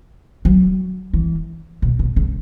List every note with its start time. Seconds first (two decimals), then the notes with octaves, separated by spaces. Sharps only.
0.45 F#3
1.13 E3
1.82 B2
1.99 B2
2.16 C#3